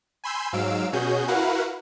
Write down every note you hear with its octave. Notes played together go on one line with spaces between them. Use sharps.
G#5 B5 C6 E6 G6
G#2 F#3 F5 E6 D7
B2 C#4 F#4 G#4 G6
E4 F#4 A#4 B4 F5 F#5